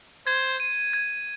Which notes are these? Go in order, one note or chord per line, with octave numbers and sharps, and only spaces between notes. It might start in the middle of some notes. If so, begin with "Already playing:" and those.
C5 G#6
D#7
G#6